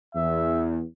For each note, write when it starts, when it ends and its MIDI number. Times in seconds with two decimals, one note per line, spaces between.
0.15 0.82 40
0.15 0.64 76